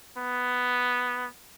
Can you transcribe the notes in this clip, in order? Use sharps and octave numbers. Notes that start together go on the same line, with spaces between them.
B3